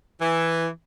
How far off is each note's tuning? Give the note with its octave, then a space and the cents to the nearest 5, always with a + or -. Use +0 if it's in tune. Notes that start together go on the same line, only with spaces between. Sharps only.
E3 +5